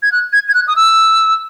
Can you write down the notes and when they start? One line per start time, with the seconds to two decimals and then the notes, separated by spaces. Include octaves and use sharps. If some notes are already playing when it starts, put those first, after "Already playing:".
0.03 G#6
0.12 F#6
0.33 G#6
0.48 G#6
0.54 F#6
0.68 D#6
0.76 E6